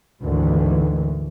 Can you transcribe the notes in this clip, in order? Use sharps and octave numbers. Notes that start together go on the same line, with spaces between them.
D2 G#2 D#3 E3